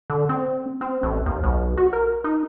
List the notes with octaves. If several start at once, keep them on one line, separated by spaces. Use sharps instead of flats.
D3
C4
C4
A1
D#2
B1
F#4
A#4
D#4